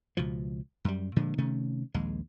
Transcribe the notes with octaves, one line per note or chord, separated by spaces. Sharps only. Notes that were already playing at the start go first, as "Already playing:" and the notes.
C#2 B2 F3
F#2 G3
A#2 D3 F3 G#3
C3 D#3 A3 C#4
A#1 D#2 G#3